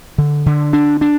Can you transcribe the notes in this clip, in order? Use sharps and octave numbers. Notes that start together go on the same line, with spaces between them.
D3
D3
D4
D4